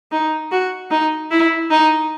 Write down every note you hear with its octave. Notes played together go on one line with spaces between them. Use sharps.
D#4
F#4
D#4
E4
D#4